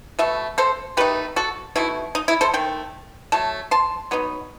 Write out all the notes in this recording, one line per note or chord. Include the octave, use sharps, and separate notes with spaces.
B2 A3 E5
A4 C5
D#3 A3 D#4 G4 B4
F#4 A4
B2 A3 D#4 E4
D#4
E4
A4 C5
D#3 A3 G5
F#3 A3 A5
A5 C6
F#3 B3 D#4